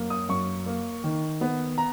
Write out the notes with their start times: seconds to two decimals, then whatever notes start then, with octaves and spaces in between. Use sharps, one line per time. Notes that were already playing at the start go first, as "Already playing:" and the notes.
Already playing: F#2 A#3
0.10 D#6
0.29 F#2 C#6
0.66 A#3
1.04 D#3
1.41 B3
1.78 A#5